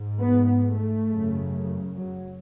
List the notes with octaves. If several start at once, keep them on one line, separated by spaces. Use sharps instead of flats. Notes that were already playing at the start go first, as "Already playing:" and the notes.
Already playing: G#2
B3
B3
A3
F#2 C#3
F#3